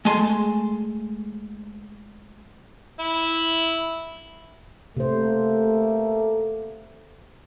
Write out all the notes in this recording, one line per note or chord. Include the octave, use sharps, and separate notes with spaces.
G#3 A3 G#5 A5 C6
E4
C3 A3 A#3 C5